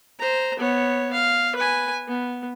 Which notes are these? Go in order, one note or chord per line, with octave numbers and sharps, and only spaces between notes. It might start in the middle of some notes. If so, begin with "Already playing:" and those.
C5 A#5
B3 C#5
F5
B4 G#5
B3